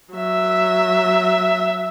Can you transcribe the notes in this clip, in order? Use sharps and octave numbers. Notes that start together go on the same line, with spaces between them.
F#3 E5